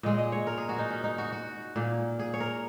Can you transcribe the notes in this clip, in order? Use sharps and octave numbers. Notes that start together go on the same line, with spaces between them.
A#2 G#3 D#5
D#5
C#5
A#4
G#4
F#4
D#4
C#4
D#4
F#4
F#4
A#2 A#3
G#4
C#5
A#4